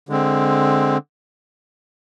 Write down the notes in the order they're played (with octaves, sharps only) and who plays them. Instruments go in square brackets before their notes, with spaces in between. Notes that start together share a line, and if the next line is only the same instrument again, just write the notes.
[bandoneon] D3 G#3 C4